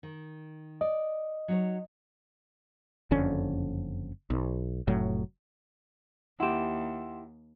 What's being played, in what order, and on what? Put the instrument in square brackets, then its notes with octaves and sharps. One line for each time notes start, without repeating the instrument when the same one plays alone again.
[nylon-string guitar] D#3
[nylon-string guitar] D5 [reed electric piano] D#5
[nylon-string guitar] F#3 D#4 C#5
[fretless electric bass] F#1 F2 D3 C#4
B1
F1 A2 F#3
[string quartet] D#2 [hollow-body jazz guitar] E4 G4 [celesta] F#5 C6 E7